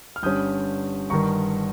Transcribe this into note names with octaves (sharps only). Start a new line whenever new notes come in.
F6
G1 G2 G3 C#4 D#6 G6
G1 G2 D#3 A#5 C#6